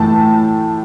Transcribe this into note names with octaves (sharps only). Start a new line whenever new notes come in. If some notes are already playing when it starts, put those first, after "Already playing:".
Already playing: A2 E3 A3 A5